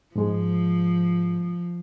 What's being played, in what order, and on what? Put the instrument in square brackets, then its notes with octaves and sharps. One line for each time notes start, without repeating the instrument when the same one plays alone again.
[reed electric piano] G#2 G#3 [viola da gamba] F3